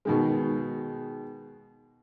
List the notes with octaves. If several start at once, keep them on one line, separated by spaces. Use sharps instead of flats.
B2 D#3 G#3